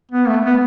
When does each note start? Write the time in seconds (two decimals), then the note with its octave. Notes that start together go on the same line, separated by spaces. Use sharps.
0.11 B3
0.28 A3
0.46 B3